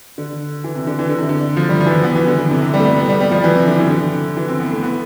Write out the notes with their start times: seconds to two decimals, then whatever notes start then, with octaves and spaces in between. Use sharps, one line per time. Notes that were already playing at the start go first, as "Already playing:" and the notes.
0.18 D3
0.64 E3
0.75 C3
0.87 D3
0.99 E3
1.09 D3
1.18 C3
1.29 D3
1.57 F3
1.69 G3
1.80 F3
1.86 E3
1.92 F3
2.04 B3
2.15 E3
2.27 D3
2.38 D3
2.50 C3
2.62 C3
2.74 G3
2.80 A3
2.85 B3
2.98 B3
3.09 G3
3.20 G3
3.31 F3
3.44 E3
3.55 C3
3.67 D3
3.79 E3
3.90 D3
4.37 E3
4.48 C4
4.60 B3
4.72 A3
4.83 B3